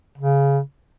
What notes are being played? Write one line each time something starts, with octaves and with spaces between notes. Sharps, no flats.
C#3